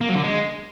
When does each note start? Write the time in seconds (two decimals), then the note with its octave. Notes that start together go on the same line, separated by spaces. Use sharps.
0.01 A#3
0.09 F#3
0.16 D3
0.24 G#3